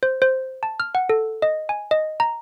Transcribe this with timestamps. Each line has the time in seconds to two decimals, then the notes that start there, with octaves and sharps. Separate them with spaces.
0.03 C5
0.22 C5
0.63 A5
0.80 F6
0.95 F#5
1.09 A4
1.42 D#5
1.69 G#5
1.91 D#5
2.20 A#5